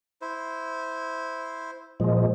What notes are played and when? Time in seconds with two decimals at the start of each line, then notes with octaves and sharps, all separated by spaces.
0.21 E4 C5
2.00 A#2 F3 G#3